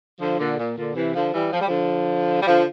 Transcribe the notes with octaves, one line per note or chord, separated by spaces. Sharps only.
D3 F3
A#2 D3
A#2
A#2 D3
C3 E3
D3 F3
E3 G3
F3
G3
D3 F3
G3
D3 F3